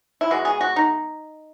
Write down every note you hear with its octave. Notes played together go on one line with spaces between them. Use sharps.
E4
B2 G#3 B3 F#4
G#4
F#4
D#4